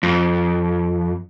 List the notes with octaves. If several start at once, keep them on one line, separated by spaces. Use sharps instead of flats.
F2